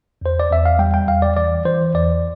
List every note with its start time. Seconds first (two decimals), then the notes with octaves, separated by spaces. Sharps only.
0.21 E2 C5
0.40 D5
0.50 E2 E5
0.66 F5
0.79 G3 G5
0.94 G5
1.08 E2 F5
1.22 D5
1.37 E3 D5
1.65 E3 C5
1.94 E2 D5